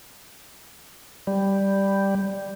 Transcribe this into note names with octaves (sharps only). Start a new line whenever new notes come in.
G3